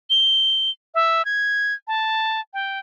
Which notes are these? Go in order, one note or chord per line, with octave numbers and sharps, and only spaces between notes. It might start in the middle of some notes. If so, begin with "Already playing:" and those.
G7
E5
G#6
A5
G5